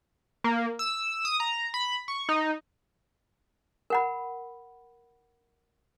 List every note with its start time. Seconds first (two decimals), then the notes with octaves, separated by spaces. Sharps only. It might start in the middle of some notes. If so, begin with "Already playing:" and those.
0.44 A#3
0.79 E6
1.25 D#6
1.40 A#5
1.74 B5
2.08 C#6
2.29 D#4
3.90 A#4 F#5 B5